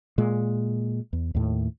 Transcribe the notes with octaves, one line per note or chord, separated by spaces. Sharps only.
A#2 G#3
E2
D#2 A2